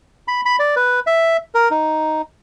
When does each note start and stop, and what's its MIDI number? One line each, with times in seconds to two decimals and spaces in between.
0.28 0.41 83
0.45 0.56 83
0.59 0.75 74
0.76 1.00 71
1.07 1.37 76
1.55 1.69 70
1.71 2.22 63